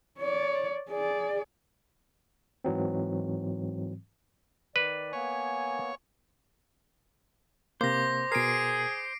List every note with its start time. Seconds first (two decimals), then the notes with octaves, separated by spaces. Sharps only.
0.18 C#5 D5
0.90 G#4 D5
2.64 G#2 E3 F#3 C4
4.76 D#3 B4 D5
5.13 A#3 B3 C#5 G#5
7.81 C3 A#3 C5 D6 A#6
8.32 B2 G#4 A#4 C7 D7